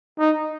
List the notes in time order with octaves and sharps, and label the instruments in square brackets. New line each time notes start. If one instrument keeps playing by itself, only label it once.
[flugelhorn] D#4